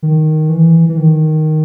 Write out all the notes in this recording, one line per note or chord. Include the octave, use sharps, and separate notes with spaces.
D#3
E3
E3
D#3